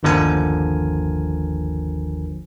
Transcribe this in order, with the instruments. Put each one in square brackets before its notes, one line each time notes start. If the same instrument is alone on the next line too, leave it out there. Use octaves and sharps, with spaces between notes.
[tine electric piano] G1 D#2 D3 F3 A#4 G#5